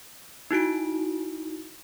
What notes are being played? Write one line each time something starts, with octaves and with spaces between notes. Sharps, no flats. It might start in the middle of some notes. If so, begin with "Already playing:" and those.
D#4 E4 F#4 D7